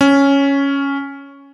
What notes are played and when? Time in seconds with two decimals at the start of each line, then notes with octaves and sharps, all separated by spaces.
0.01 C#4